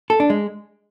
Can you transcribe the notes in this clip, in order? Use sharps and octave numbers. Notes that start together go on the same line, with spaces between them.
A4
D4
G#3